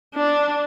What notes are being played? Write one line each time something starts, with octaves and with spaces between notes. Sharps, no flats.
D4